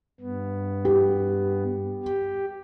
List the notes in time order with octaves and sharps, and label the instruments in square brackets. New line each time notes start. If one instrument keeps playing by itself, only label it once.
[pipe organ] G2 B3
[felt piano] G4
[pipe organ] G4